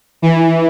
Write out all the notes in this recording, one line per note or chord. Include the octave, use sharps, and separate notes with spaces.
E3